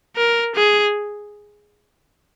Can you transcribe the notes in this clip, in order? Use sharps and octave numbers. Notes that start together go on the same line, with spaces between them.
A#4
G#4